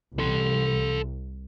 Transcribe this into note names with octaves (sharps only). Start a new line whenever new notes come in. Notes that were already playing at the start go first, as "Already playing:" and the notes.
C2 A4 C6